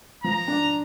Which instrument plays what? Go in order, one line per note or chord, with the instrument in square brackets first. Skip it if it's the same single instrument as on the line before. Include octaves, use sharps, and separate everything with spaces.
[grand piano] F3 [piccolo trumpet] A#5
[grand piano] D4